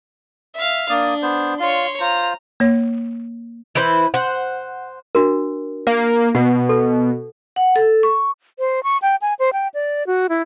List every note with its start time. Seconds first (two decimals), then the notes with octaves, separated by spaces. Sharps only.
0.55 E5 F5
0.90 A#3 D4 D5 D#6
1.22 B3 C5
1.60 F4 C#5 C6
2.00 F4 C5 A#5
2.60 A#3 C#5
3.75 E3 E4 B4 C5
4.14 C5 F#5
5.15 D4 F#4 A#4
5.87 A#3
6.35 B2 F#5
6.69 A4
7.56 F#5
7.76 A4
8.03 C#6
8.59 C5
8.83 C#6
9.02 G5
9.22 G#5
9.39 C5
9.53 G5
9.74 D5
10.07 F#4
10.29 E4